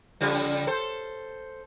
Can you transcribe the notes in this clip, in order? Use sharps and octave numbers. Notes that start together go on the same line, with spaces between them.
C#3 F3 G3
A4 C5